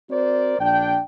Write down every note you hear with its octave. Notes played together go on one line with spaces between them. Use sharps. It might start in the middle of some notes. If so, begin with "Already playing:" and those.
C4 F#4 A#4 C5 D5
A#1 D4 G5